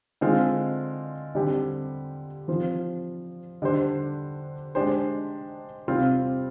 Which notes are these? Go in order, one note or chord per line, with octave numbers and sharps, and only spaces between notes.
D3 G#3 C4 F4
D3 G3 C4 G4
F3 C4 F4 C5
D3 G3 D4 G4 C5
G#3 D4 G4 C5
C3 G3 C4 F4